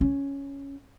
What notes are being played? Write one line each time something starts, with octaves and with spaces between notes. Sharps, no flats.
C#4